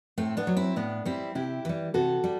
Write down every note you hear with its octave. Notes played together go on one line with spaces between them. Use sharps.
A2 A3 C4
B3 D4
F#3
C4 E4
A2 B3 D4
G3 C4 E4
C3 E4 G4
E3 G3
C3 F#4 A4
G3